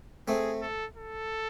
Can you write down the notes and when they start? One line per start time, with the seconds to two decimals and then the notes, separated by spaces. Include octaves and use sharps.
0.28 A3 C4 G#4
0.62 A4
0.96 A4